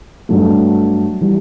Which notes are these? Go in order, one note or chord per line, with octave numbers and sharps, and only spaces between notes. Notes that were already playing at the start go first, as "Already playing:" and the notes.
G2 F#3 A3
E3 G3